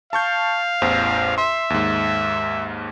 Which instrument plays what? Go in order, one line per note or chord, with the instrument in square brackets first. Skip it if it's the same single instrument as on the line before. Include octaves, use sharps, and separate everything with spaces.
[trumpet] F5 [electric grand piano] A5 C#6 G6
[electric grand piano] A1 E2 C5
[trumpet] E5 [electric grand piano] C6
[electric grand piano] D#2 G#2